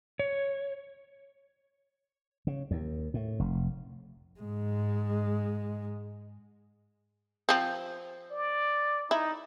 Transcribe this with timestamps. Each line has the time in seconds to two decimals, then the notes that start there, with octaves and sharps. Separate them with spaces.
0.19 C#5
2.47 C#3
2.71 D#2
3.14 A2
3.39 F1
4.40 G#2 G#3
7.49 F3 C4
8.31 D5
9.11 D#4 E4